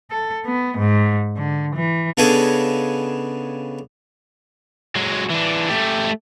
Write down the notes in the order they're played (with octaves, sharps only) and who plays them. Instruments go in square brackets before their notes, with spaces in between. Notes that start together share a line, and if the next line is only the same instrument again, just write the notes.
[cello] A4
B3
G#2
D3
E3
[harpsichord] C#3 B3 D4 G#4 A4 D#5
[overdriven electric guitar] F#3 G#3
E3 D4
A3 G4